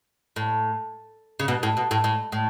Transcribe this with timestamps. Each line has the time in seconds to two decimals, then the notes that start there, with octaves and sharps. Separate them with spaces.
0.36 A2
1.40 C#3
1.48 B2
1.63 A2
1.77 B2
1.91 A2
2.04 A2
2.32 A2